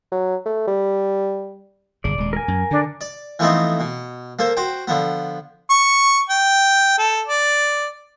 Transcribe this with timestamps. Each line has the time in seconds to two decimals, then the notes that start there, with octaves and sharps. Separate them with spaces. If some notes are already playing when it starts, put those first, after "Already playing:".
0.12 F#3
0.46 A3
0.67 G3
2.04 G1 C#3 D5
2.18 D#1 G#3
2.33 A#4 G#5
2.48 F#2
2.71 D3 D4
3.01 D5
3.39 E3 F3 A3 B3 C4 D#4
3.80 B2
4.39 A#3 A4 C5
4.57 F#4 C5 G5
4.87 D3 F3 B3
5.70 C#6
6.29 G5
6.98 A4
7.26 D5